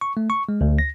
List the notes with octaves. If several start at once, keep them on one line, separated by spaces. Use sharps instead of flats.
C#6
A3
C#6
G#3
D2
A#6